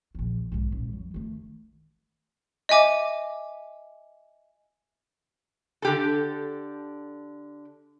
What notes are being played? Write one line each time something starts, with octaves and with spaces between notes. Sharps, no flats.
A#1 D#2
B1 G#2
D#1
F2 F#3
D#3 A3
D#5 E5 G#5 D6
D3 G4 A4